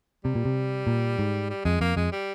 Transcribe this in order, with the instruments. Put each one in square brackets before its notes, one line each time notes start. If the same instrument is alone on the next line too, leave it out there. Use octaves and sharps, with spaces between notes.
[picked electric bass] C3 [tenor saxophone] G3
[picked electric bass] A#2
C3
A#2
G#2
[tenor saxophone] G3
[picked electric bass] F2 [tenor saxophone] G#3
[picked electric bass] F2 [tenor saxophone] A#3
[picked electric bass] F2 [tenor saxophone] G#3
[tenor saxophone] G3